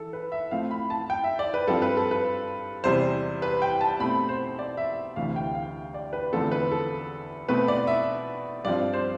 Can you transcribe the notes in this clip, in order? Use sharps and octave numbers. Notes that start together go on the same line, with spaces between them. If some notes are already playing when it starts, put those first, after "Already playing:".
Already playing: E3 A4
B4
E5
A2 F3 A3 C4 F5
B5
A5
G5
E5
D5
B4
G2 F3 C4 A4
B4
A4
B4
E2 C3 G3 C5
B4
G5
A5
B2 A3 C4 B5
C5
D5
E5
D2 C3 E3 F5
G5
F5
D5
B4
E2 D3 F3 A3 C4 A4
B4
A4
B2 A3 C4 B4
D5
E5
G2 F3 C4 D5
C5